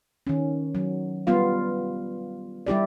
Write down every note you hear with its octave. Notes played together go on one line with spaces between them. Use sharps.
D#3 C#4
F#3
G3 B3 F4 F5
G3 E4 G4 D5